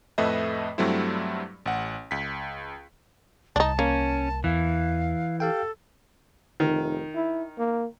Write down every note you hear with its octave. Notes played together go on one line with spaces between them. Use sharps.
F2 A2 A3 B4 D#5 E5
G2 F#3 G3 A3 C4 E4
A1 F#5
C#2 B6
C2 D4 D#4 A5
A#3 C#4
E2 E3 F5
G4 A4 F5 G5
F1 D#3
E4
A#3